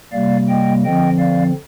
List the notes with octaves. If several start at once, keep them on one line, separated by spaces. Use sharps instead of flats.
C3 G3 A#3 D5 F5
D#5 G5
D3 F3 C4 D#5 G5
D5 F5